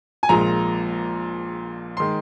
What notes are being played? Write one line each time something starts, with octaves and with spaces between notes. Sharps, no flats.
G#5
A#1 A#2 G#3 A#5
D#3 G#3 C6